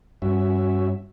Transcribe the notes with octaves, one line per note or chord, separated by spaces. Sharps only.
G2 C#4 F#4 E5